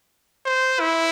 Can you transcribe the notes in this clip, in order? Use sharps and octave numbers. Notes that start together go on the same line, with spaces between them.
C5
E4